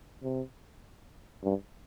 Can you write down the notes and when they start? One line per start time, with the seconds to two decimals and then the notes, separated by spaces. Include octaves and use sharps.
0.23 C3
1.44 G2